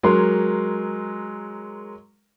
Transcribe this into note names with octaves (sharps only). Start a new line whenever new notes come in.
F#3 G#3 A#4 C6